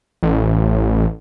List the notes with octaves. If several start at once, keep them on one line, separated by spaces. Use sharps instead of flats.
A1